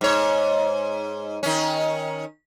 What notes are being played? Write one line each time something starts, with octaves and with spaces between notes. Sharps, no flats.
G#2 C#5
D#3 C#4